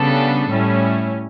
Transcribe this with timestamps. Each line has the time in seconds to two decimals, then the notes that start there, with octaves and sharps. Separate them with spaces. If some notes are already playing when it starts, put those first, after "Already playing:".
Already playing: C#3 G3 B3 D4 A4
0.49 A2 G3 C#4 E4